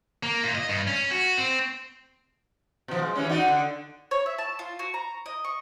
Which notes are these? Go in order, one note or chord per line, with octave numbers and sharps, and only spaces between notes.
A#3
A#2
D#5
G2
C#4
F#4
C4
B2 F3
G#3
E3 G3 C#4
D#4 F#4 D5
D3
C#5
E5
A5
F4
F#4
A#5
D#5
C#6